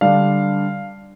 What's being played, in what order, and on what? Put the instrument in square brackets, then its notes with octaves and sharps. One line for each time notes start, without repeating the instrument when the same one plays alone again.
[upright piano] D3 G3 D4 F5